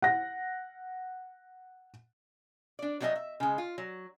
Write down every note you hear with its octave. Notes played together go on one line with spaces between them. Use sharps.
F#5 A#6
D4 D5
F#3 G3 D4 G#4 D#5 E5
E5
C#3 G#3
F4
F#3